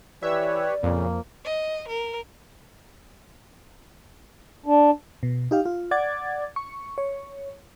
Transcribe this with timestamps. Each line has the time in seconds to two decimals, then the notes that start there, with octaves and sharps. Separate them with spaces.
0.23 E3 G4 B4 C#5 D5 E5 E6
0.83 F2 A#2 C#3 F3 A#3
1.45 D#5
1.88 A#4
4.66 D4
5.23 B2
5.51 D#4 G4 F5
5.66 F4
5.91 D5 F#5 D6 G#6 A6
6.56 C#6
6.98 C#5